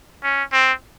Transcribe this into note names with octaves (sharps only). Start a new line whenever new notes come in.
C#4
C4